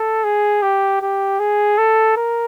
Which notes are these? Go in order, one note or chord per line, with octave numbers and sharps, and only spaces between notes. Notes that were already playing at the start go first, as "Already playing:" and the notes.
Already playing: A4
G#4
G4
G4
G#4
A4
A#4